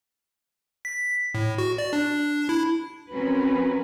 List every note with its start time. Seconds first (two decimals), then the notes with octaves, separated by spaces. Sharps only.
0.85 B6
1.34 A2
1.58 F#4
1.78 D5
1.93 D4
2.49 E4
3.12 F3 C4 C#4 F#4 A#4 B4